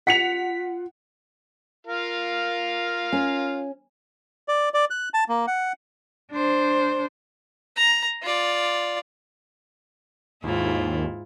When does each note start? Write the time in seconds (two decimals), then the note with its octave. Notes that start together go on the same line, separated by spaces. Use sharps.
0.07 F4 F#5 B6 C#7 F7
1.87 F4 A#4 F5
3.12 C#4
4.48 D5
4.74 D5
4.90 F#6
5.14 A5
5.29 A#3
5.47 F#5
6.32 D4 C5
7.76 A#5
8.22 F4 D5
10.44 D#2 G#2 E4 F4